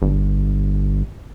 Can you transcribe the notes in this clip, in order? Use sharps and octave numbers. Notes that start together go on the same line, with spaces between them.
G1